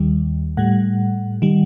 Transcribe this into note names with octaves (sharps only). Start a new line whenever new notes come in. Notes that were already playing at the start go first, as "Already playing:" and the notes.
Already playing: D#2 D#3 G3
A2 G3 F#5
D#3 G3